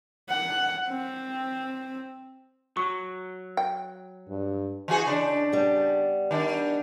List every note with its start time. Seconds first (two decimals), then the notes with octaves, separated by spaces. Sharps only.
0.29 F#5
0.89 C4
2.77 F#3 C#6
3.57 G5
4.29 G2
4.88 E3 F#4 G#4
5.07 C#3 D4
5.52 G3 B3
6.31 D#3 D4